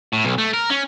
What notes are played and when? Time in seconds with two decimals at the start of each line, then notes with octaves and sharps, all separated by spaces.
0.13 A2
0.24 B1
0.38 A3
0.54 A#4
0.70 C#4